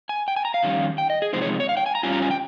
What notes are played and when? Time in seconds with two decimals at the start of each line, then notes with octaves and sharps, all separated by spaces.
0.09 G#5
0.28 G5
0.36 G#5
0.45 A#5
0.54 F5
0.63 F2 D#3 G3 C#4
0.98 G5
1.10 D#5
1.22 G#4
1.33 C3 F3 G#3 C4 D#4 C5
1.42 C#5
1.60 C#5
1.69 F5
1.77 G5
1.86 G#5
1.95 A#5
2.03 G2 G3 C#4 F4 G#5
2.13 A#5
2.22 G#5
2.31 G5